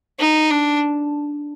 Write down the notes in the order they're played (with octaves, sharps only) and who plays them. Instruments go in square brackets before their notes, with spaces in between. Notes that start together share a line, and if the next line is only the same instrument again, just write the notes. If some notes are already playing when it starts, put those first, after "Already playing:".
[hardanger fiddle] D#4
D4